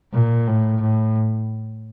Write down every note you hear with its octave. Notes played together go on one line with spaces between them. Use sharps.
A#2
A2
A2